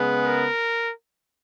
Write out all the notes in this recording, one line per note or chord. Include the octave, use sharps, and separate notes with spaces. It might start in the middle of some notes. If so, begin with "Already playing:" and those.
Already playing: C#3 G#3 B3
A#4